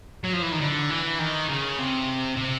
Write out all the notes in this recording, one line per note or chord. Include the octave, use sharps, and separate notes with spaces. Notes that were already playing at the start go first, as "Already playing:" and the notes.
F#3
F3
E3
D#3
D3
E3
D#3
C#3
C3
C3